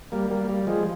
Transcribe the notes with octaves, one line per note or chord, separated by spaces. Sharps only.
G3 A#3
G3 A#3
G3
F3 G#3